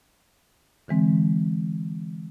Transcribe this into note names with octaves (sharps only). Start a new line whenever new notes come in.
D3 E3 G#3 C4